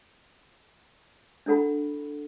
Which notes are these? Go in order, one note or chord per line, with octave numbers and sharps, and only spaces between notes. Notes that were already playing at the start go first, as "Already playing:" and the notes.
D4 E4 A4 F#5 B5